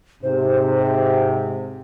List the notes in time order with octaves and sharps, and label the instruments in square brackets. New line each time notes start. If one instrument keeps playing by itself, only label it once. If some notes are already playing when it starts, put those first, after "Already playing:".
[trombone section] G#2 C3 [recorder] C5